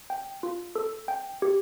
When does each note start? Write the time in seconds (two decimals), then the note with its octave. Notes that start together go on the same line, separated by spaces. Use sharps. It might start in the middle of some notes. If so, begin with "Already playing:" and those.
0.10 G5
0.43 F4
0.75 A4
1.08 G5
1.42 G4